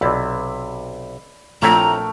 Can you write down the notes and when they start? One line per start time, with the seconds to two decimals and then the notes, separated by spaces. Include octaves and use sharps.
0.01 B1 C3 D5 B5 E6
1.62 A#1 A3 C4 E4 A#4 C#5 G5 A#5